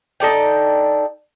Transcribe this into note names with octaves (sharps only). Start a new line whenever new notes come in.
D#4 A4 D5 G5